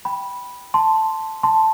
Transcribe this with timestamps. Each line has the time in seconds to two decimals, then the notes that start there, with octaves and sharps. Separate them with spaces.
0.05 G5 B5
0.74 A5 C6
1.43 A5 C6